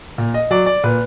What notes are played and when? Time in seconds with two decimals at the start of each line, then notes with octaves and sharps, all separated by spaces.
0.18 A#2
0.34 D#5
0.51 F#3 D5
0.66 D5
0.84 A#2 B4